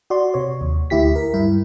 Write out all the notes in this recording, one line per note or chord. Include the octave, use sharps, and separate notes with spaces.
F#4 D5 C6
C3 C#5
D#2
D2 E4 G4 B6
A#4
G2 E4